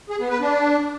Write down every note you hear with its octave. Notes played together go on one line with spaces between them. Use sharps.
G#4
B3
B4
D4